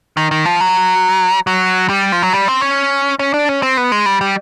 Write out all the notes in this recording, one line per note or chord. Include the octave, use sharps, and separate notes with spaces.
D#3
D#3
F3
F#3
F#3
G3
F3
F#3
G3
C4
C#4
C#4
D4
C#4
C4
B3
G#3
G3
G3